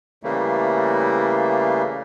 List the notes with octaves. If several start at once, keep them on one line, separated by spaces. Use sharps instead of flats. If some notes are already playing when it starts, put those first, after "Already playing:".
C#3 E3 G3 A3 A#3